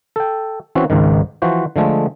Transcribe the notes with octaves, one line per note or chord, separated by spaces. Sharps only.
A4 G5
E3 C4 C#4 F#4
G#1 C#2 G#2 D#3
E3 F3 F#4 C5
D3 F3 G#3 A3